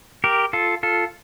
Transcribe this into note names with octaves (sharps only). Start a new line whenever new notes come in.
G4 A#4
F4 A4
F4 A4